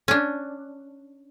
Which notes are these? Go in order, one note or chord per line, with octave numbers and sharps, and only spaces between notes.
C#4 D4